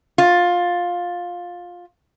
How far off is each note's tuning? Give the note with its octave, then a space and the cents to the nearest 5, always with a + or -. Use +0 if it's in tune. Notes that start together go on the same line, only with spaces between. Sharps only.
F4 +15